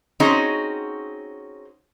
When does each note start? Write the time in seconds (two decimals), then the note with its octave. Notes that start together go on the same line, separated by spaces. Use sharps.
0.20 C4 C#4 D#4 F#4 G#4